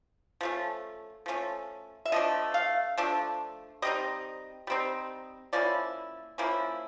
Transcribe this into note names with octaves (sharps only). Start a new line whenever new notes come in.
F3 A3 C#4
F3 A3 C#4
E5
F3 A3 D4 D#5
F5
F3 A3 D4
G3 C4 D#4 D#5
G3 C4 D#4
F3 A#3 C#4 E4 D5
F3 A#3 C#4 E4